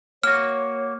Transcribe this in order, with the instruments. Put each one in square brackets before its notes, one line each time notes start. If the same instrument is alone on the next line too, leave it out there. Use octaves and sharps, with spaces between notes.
[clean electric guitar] A#3 F#4 [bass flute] C#5 [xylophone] F6